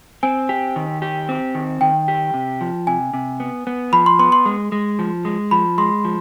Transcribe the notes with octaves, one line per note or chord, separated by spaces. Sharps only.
C4 G#5
G4
D#3
G4
C4
D#3
D#3 G5
G4
C3
F3
C3 G#5
C3
B3
B3
F3 B5
C6
B3 C6
C6
G#3
G#3
F3
G#3
F3 B5
G#3 C6
F3